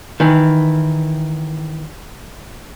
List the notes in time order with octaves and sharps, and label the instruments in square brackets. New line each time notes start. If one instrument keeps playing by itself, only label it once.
[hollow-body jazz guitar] D#3 E3